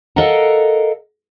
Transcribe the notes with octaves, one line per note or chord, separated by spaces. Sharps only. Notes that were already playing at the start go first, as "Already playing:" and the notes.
A4 A#4 D#5 F5 F#5 A#5